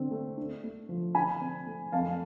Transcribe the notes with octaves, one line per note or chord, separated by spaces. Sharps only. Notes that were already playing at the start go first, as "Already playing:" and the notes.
Already playing: D3 C4
A3
D4
A3
F3
D3 G#5 B5
C4
A3
F2 F5 A5